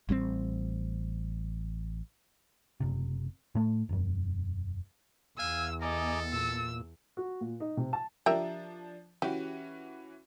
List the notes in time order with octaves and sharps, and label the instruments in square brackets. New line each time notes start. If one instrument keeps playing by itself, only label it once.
[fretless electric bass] A1 G3 B3 C4
[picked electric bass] F#1 C3
A2 A3
E1 F#2
[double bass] E2 [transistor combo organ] F5 [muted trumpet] G#5 [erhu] E6
[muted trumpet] A4 [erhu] D#5 [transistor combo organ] G#5 A#5 D6
[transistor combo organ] A#2 [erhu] E6
[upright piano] F#4
A#2
D#4
C3
A5
[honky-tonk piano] F3 D4 [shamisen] G4 A#4 E5
[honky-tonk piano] E3 C#4 F#4 [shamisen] G4